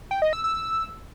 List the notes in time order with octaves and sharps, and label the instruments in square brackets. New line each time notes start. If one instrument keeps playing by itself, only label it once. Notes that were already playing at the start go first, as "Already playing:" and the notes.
[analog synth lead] G5
D#5
E6
E6